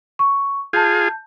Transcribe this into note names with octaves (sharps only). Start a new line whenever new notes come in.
C#6
F4 G#4 A5 G6